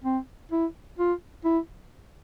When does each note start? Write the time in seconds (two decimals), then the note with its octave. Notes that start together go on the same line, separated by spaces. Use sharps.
0.04 C4
0.52 E4
0.98 F4
1.44 E4